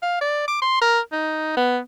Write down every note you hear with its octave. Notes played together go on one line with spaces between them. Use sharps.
F5
D5
D6
C6
A#4
D#4
B3